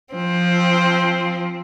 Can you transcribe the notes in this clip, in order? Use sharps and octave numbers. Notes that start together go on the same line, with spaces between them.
F3 C4